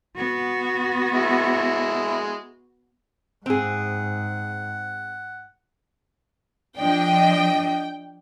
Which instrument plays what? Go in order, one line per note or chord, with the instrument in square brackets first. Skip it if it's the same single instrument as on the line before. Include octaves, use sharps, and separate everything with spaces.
[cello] B3 F#4
[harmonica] G#3 E4
[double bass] G#2 [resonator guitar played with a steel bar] C4 G#4 [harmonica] F#5
[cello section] F3 D4 D#5 [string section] G5